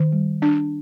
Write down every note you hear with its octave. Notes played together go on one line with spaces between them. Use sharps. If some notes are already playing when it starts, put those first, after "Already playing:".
Already playing: D#3
G3
D4